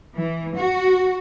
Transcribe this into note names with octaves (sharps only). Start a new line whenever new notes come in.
E3
F#4